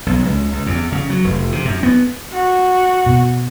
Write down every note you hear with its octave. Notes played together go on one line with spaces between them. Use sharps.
B1
C#2
C#2
E2
C#3
F#3
F1
C3
F#2
B3
F#4
B2